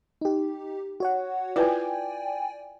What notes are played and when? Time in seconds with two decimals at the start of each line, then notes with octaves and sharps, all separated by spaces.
0.21 D#4 G4
1.00 F#4 C#5 F#5
1.56 E4 F4 B4 D5 G5 G#5